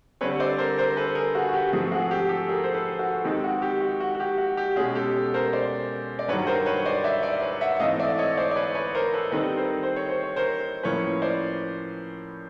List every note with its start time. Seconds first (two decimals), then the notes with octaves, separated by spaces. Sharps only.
0.21 D3 G3 C4 B4 C#5
0.40 C5 D5
0.58 A#4 C5
0.78 A#4 C5
0.97 A4 B4
1.15 G#4 A#4
1.35 F#4 G#4
1.49 F#4
1.53 G4
1.73 G#2 F3 A3 C4 F#4 G#4
1.91 F#4 G#4
2.11 G4
2.29 G4 A4
2.49 G#4 A#4
2.64 C5
2.74 A4 B4
2.99 F#4
3.24 D#3 G#3 C4 D#4 G4
3.44 F#4
3.62 G4
3.81 F#4
4.00 F#4
4.15 F#4
4.20 G4
4.38 F#4
4.57 G4
4.76 B2 G#3 C#4 F#4 G#4
4.95 G4 A4
5.34 A#4 C5
5.53 C5 D5
6.19 D5
6.28 G2 D#3 F#3 B4 C#5
6.47 A#4 C5
6.66 B4 C#5
6.85 C5 D5
7.04 D5 E5
7.23 D5 E5
7.42 B4 C#5
7.61 E5 F#5
7.80 G#2 E3 A3 C4 D#5 F5
7.99 D5 E5
8.18 C#5 D#5
8.37 C5 D5
8.51 D5
8.56 B4 C#5
8.75 B4 C#5
8.95 A#4 C5
9.13 A4 B4
9.32 D#3 G3 C4 D#4 A4 B4
9.57 A#4 C5
9.83 C5
9.96 C#5
10.09 C5
10.23 C#5
10.36 A#4 C5
10.83 A2 F3 A#3 C#4 B4 C#5
11.22 C5 D5